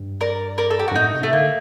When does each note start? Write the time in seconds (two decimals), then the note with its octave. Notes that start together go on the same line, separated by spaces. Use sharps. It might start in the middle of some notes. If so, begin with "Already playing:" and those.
Already playing: G2
0.21 A#4 D5
0.58 A#4 D5
0.70 A4
0.79 G4
0.88 F#4
0.91 G2
0.95 A2 D#4
1.14 C3
1.23 A3
1.33 D3 A#3